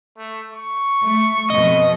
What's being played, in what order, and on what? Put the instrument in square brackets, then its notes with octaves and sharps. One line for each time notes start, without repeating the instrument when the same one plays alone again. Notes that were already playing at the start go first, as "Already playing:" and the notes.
[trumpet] A3
C#6
[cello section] A3
[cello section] F2 B2 [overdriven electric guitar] D#5